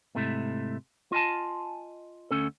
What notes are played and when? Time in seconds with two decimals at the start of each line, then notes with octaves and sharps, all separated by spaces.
0.15 G#2 C3 A3 E4
1.12 F4 D#5 G#5 A5
2.31 D2 C#4 A4